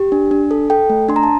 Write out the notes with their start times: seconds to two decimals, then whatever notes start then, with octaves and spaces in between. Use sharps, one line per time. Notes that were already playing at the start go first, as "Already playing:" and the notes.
Already playing: G4
0.12 D4
0.31 D4
0.51 A4
0.70 A4 G5
0.90 A3
1.09 D4 C6
1.16 A#5
1.23 A5